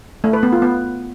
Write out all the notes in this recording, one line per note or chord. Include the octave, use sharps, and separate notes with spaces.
A3
B4
B3
F4
B3